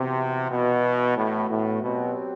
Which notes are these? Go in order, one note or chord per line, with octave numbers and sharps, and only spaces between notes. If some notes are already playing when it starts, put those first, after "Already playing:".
Already playing: C3 E3 B3 F#4
B2
A2
A2
B2 F#3 C4 G4